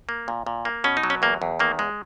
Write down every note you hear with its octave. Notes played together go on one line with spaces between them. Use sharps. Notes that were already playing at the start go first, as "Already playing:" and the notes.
A#3
A#2
A#2
A#3
B2 C#4
D#4
F#3
C#4
E2 A#3
E2
D#3 A#3
G#3